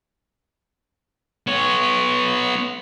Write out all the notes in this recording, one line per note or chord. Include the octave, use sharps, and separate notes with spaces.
B3 C#5